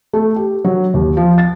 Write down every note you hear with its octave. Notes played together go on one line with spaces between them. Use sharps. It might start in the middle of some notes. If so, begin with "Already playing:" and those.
A3
G4
F#3
D#2
F3
A6